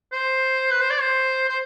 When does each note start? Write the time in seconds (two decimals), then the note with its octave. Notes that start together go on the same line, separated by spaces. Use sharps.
0.12 C5
0.71 B4
0.81 C5
0.90 D5
1.01 C5
1.49 C5